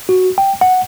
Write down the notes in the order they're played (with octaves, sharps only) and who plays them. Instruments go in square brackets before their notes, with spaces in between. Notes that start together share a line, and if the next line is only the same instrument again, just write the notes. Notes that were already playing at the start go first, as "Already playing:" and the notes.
[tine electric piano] F#4
G5
F#5